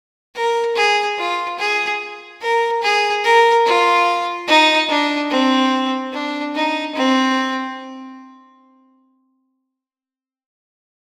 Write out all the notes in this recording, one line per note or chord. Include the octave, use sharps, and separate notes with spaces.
A#4
G#4
F4
G#4
A#4
G#4
A#4
F4
D#4
D4
C4
D4
D#4
C4